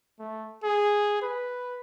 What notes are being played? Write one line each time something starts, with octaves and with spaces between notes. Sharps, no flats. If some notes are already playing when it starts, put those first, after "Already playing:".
A3
G#4
B4